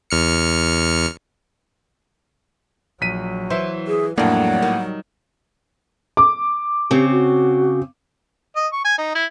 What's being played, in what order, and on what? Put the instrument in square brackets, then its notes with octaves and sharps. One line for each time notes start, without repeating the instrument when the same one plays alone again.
[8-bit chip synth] E2 F6 C#7
[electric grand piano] A#1 B6 D#7 [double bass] F#3
[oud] E3 [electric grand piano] C5 E5
[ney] G#4
[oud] F2 D4 [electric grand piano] A2 A#3 [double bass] F#3 G3 [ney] F#5
[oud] D#3
[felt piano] D6
[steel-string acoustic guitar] C#3 C4 [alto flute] G4
[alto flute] F#4
[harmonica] D#5
C#6
G#5
D#4
E4